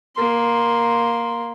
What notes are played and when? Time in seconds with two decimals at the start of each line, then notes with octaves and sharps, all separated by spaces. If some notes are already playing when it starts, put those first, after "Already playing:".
0.15 A#3 C6